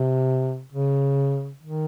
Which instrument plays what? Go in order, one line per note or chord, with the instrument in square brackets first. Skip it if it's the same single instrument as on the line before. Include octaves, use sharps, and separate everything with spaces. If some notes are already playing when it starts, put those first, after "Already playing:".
Already playing: [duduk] C3
C#3
D#3